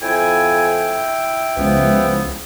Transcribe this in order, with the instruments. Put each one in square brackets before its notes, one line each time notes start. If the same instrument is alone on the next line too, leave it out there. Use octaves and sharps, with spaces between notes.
[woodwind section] F2 G#5 [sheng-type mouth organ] E4 G5
[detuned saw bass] C#2 [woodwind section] E3 F3 B3